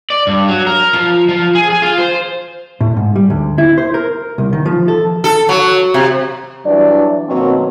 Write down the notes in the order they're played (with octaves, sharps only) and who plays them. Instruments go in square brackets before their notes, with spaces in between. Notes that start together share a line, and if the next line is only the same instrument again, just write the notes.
[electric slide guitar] D5
G2
F#3
A#4
F3
F3
G#4
G#4
F4
C5
[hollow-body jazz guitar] A2
G#2
G3
D2
E4
C5
A#4
C2
D#3
F3
A4
[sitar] A4
F#3
C3
[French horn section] G2 E3 F#3 D4 D5
B2 D#3 F#3 A#3 C4